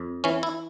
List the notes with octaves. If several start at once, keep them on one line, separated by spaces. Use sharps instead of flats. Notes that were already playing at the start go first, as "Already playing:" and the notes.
Already playing: F2
E3 C#4
E4